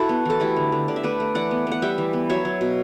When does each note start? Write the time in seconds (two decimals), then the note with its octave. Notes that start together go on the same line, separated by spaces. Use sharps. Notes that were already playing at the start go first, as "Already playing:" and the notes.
Already playing: E4 F#4 A4
0.09 B3
0.25 E3 A4
0.40 A3 E4 G4
0.56 D3
0.72 D3
0.88 D3 D5
0.96 E5
1.03 A3 B4 D5
1.20 A3
1.35 E3 D5 F#5
1.51 B3
1.67 B3 F#5
1.82 G3 E5 G5
1.98 E3
2.13 B3
2.30 F#3 C#5 E5
2.45 F#3
2.61 B2